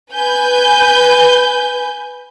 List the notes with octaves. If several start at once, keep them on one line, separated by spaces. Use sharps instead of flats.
B4 G#5 G6